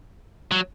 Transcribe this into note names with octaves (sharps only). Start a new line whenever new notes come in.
F#3